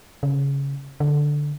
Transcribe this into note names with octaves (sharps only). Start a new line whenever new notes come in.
C#3
D3